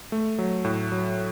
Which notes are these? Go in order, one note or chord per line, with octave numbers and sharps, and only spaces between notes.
A3
F#3
A2
F#3